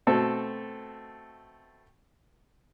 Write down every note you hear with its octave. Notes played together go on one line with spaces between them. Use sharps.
B2 A3 C4 A4